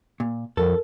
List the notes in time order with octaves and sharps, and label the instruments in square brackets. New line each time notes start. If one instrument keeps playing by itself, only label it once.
[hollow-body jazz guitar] A#2
[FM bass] F2 [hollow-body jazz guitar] A4 [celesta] A#4